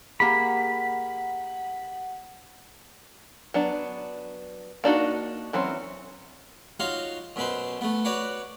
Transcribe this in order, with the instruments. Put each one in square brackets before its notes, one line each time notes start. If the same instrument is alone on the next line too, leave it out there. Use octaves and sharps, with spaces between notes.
[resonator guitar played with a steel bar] A#3 G4 G#4 [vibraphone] F#5 [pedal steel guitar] B5
[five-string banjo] F#3 B3 D4
A#3 D4 D#4 F#4
E3 F#3 C4 C#4
[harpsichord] D#4 F4 F#4 C#5 F5
F#2 B2 B4 C5
A3 B3
F#4 B4 C#5 D5 F#5